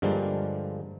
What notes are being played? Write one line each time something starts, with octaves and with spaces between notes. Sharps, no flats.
G2 D3 F3 G3 G#3 A#3